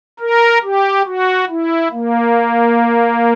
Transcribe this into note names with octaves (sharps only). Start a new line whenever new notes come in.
A#4
G4
F#4
E4
A#3